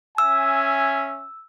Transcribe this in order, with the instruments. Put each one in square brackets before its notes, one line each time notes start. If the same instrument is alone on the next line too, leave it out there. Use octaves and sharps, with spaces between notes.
[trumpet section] C#4 E5 G#5 [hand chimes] E6